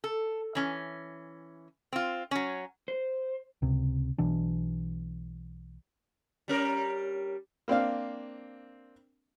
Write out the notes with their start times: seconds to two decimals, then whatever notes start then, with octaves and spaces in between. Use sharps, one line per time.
0.04 A4
0.55 E3 C#4
1.93 C4 F4
2.31 F#3 C#4
2.88 C5
3.62 C#2 C3
4.18 B1 B2 E3 D4
6.48 G3 C#4 A#4
7.68 A#3 C4 D4 F5